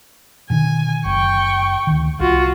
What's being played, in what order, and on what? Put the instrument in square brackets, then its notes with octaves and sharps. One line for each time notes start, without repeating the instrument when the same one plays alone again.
[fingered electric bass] B2 D3 D#3 [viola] G#5
[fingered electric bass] F#1 [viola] G5 C#6
[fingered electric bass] D2 D#3
[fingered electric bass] C2 [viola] F4 F#4